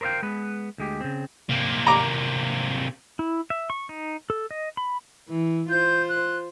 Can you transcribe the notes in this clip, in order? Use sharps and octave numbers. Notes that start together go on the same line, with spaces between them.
A#4 C5 D#5 F5 G5
G#3 B3 B4
D2 G#3 G4
C#3 C4
C3 A#3
A#5 D6
E4
E5
C#6
D#4
A4
D#5
B5
E3
F4 C5 G6
F#6